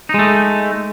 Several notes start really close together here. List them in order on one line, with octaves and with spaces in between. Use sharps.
D#4 G#3 A3